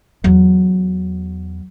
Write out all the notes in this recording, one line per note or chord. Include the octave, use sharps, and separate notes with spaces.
E2 F#3